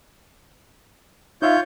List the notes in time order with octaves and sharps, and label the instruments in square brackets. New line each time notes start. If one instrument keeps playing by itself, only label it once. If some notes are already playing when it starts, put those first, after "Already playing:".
[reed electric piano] D#4 E5 F5 [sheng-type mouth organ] F4 C#5 G6